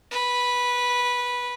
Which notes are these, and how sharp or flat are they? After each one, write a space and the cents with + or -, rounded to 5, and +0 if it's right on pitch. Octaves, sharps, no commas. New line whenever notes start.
B4 -10